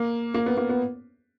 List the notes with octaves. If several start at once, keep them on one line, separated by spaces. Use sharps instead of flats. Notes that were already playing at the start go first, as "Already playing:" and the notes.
Already playing: A#3
A#3
B3
A#3
B3